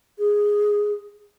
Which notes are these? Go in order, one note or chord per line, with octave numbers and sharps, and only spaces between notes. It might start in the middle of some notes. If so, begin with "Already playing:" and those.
G#4